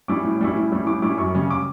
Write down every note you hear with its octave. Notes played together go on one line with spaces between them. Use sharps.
G3 C#4 E4 D6
A2
G3 C#4 E4
A2
G3 C#4 E4
A2 D6
G3 C#4 E4 D6
F#2 C#6
C#3 G3 C#4
D6